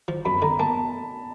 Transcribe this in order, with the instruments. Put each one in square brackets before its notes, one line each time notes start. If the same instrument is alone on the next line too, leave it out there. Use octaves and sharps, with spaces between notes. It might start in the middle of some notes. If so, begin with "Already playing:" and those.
[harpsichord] F3
[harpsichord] F#2 [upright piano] B5
[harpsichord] D3 [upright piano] A#5
[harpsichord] A#3 [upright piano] A5